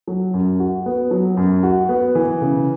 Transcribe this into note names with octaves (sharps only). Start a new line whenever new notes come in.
F#3
F#2
F#4
B3
F#3
F#2
F#4
B3
E3
C#3